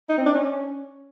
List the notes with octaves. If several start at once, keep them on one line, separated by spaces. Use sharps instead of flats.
D#4
C4
D4
C#4